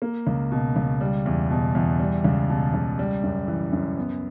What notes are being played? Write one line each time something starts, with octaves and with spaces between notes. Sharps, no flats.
A#3
C#2
B2
C#2
G3
E2
B2
E2
G3
C#2
B2
C#2
G3
F#2
E3
F#2
B3